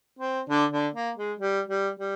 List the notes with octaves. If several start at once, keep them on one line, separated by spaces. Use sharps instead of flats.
C4
D3 D4
D3 D4
A#3
G#3
G3
G3
G3